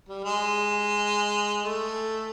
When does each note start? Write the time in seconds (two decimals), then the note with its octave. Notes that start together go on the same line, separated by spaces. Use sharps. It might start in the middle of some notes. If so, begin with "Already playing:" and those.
0.08 G3
0.24 G#3
1.62 A3